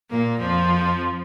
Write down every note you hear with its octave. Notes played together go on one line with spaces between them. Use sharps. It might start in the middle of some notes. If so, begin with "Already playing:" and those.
A#2 A#3
F2 F3